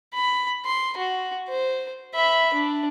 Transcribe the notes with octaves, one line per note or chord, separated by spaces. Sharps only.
B5
C6
F#4
C5
E5 B5
D4